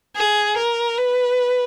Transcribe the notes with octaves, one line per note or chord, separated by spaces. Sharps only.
G#4
A#4
B4